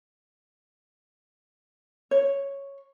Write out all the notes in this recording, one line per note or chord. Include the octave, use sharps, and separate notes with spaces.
C#5